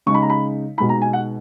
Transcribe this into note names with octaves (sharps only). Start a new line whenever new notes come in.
C#3 G#3 D#4 C#6
B5
A#5
B5
B2 G#3 D#4 B5
A#5
G#5
F#5